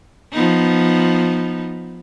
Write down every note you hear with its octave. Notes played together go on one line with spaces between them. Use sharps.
F3 B3 D#4